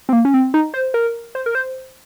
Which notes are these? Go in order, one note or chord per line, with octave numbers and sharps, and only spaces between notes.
C4
A#3
C#4
C4
D#4
C5
A#4
C5
A#4
C5